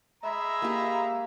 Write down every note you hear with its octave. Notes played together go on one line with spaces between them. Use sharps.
G#3 E5 A#5 B5
A#3 G4